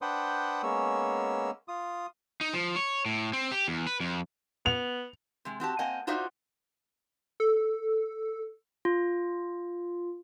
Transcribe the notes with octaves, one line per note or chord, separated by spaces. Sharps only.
D4 B4 C5 F#5 G5 D#6
G#3 A#3 B3 C#4 C#5 E6
F4 D#6
D#4
F3
C#5
A2
C4
G4
E2
B4
F2
B3 F7
C3 G#3
C4 F#4 G4 A5
A#3 C4 D#5 F#5 G#5
D#4 F4 F#4 C5 D5 E5
A4
F4